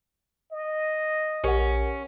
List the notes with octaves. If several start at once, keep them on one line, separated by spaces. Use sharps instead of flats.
D#5
A#1 C#4 G4 A#4 F#5